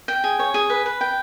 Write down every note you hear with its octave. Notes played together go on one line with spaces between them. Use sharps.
G5
G#4
C#5
G#4
B4
B4
G5